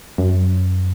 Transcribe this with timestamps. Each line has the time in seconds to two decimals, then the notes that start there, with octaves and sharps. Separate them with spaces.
0.18 F#2